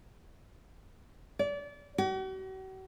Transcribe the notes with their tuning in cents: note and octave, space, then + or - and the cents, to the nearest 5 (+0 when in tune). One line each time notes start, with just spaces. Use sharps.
D5 -30
F#4 +45